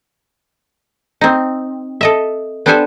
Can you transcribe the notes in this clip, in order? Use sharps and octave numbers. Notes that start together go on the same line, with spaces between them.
C4 D#4
A4 D#5 E5
B3 D4 G4 A4 C5 G#5